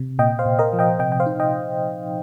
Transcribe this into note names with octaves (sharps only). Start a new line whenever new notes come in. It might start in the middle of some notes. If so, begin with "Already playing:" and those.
Already playing: C3
A#2 D#5 G5
C5 F5
A#2
A#4 D#5
F3
D#5 G5
C3 D#5 G5
G5
C5 F5
D#4
D#5 G5